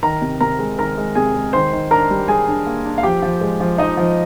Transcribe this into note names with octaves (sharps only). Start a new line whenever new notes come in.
D#3 A#4 A#5
C3
C3 A#4 A#5
G#3
D#3 A#4 A#5
G#3
C3 G#4 G#5
G#3
D#3 C5 C6
D#3
D4 A#4 A#5
G3
G3 G#4 G#5
D4
A#3
D4
F5
F3 G4 G5
F3
G#3
F3
F3 D#4 D#5
F3